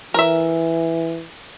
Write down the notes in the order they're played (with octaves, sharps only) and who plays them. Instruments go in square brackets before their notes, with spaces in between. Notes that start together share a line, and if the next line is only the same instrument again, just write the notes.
[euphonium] E3 [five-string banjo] A#4 E5